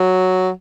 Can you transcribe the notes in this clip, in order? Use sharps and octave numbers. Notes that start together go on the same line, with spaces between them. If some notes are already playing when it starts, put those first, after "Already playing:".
Already playing: F#3